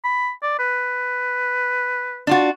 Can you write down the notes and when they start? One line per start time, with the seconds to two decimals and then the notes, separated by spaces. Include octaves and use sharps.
0.04 B5
0.43 D5
0.59 B4
2.27 D4 F4 F#4